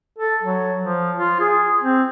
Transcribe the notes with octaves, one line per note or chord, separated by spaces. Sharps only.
A4
F#3
F3
F4
G#4
C4